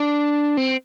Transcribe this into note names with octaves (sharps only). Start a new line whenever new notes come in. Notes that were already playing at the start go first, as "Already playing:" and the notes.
Already playing: D4
C4